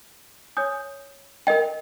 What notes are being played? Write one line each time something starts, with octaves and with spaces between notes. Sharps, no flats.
C#5 G#5 D#6 G6
A#4 D#5 G5